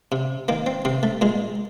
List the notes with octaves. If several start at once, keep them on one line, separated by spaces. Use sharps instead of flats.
C3
D#3 A#3
C4
C3 C4
A3
A#2 G#3